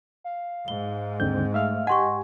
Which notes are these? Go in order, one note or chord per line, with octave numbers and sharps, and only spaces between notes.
F5
G#2 G7
D#2 D3 C4 G6
A3 E5 F5 F6
G4 D#5 F#5 G#5 C6 C#6